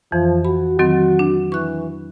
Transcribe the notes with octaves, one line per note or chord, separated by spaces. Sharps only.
F2 E3 F3
F#4 B5
D#3 F#3 C4 F#4
D4
E3 C#6 F#6